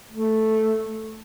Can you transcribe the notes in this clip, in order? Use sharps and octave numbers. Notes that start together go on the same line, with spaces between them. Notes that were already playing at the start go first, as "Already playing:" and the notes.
A3